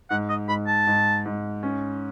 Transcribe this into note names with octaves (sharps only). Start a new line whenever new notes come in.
G#2 F#5
D#5
G#2 B5
A5
G#2
G#2
C#4